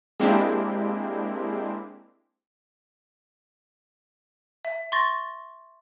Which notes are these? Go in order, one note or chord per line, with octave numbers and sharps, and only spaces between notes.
G#3 A#3 C4 D4 E4 G4
E5
C6 C#6 A6 A#6